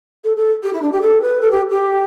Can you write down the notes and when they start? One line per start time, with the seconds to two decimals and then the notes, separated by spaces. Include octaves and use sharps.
0.24 A4
0.37 A4
0.63 G4
0.73 E4
0.82 D4
0.92 G4
1.01 A4
1.22 B4
1.41 A4
1.51 G4
1.70 G4